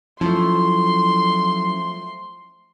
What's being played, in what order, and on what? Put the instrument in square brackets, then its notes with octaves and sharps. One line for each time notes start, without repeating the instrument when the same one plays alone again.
[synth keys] F3 A3 [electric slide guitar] F#3 C#4 E4 [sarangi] C6